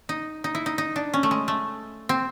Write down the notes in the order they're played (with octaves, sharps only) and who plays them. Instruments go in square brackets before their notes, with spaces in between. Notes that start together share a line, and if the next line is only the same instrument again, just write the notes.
[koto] D#4
D#4
E4
D#4
D#4
D4
C#4
A3
G#3
A3
C4